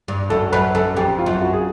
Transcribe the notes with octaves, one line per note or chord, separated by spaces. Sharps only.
G2
F#2 A4
F#2 B4
F#2 A4
F2 G4
F4
F#2
F#4
G#4